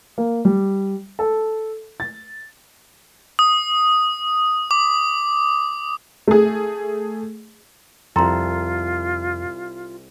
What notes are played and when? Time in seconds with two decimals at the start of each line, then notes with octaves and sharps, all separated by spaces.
0.18 A#3
0.45 G3
1.19 A4
2.00 A6
3.39 D#6
4.71 D6
6.28 A3 G#4
8.16 C2 F2 F4 A4 G5 A#5 C6